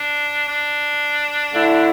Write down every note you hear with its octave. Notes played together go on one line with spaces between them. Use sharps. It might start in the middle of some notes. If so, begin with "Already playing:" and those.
Already playing: D4
D4
D3 A3 E4